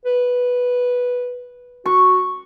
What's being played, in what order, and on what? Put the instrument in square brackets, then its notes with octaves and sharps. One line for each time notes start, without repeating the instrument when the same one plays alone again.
[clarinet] B4
[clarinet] F#4 [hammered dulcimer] C#6